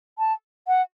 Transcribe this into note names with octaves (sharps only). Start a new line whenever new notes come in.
A5
F#5